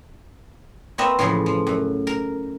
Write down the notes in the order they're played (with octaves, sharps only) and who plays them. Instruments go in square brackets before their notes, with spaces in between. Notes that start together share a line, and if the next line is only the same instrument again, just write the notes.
[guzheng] A#3 C4 F#4 B4 D#5 E5
A2 C#3 E3 F3 G#4
F3
F#2
A#4